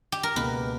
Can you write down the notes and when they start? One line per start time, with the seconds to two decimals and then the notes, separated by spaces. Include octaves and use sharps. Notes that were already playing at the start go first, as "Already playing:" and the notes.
0.12 G4
0.23 A#4
0.35 C#2 B2 A#3 B4